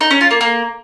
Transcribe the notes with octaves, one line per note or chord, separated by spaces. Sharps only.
D#4
C#4
F4
A#3
A#3